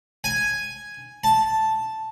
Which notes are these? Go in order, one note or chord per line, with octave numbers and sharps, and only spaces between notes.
G#5
A5